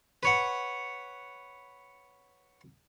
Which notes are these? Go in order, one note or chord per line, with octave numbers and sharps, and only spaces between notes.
B4 C#5 F#5